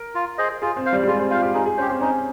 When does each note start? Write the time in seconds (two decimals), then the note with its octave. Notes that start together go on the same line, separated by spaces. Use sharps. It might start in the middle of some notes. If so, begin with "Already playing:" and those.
Already playing: A#4
0.15 F4
0.38 G#4 C5 D#5
0.62 F4 G#4
0.76 C4
0.85 C5 F5
0.93 G3
1.03 G3
1.08 G#3 F4
1.19 C4
1.31 F4 C5 F5
1.42 G4
1.54 D#4 G#4
1.66 G#4
1.77 C#4 C5
1.81 G4
1.89 C4
2.01 C#4 D#4